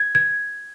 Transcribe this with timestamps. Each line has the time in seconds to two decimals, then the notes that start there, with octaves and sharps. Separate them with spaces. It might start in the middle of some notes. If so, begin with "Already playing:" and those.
Already playing: G#6
0.15 G#6